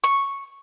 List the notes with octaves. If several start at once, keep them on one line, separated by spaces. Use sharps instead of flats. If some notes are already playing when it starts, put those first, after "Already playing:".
C#6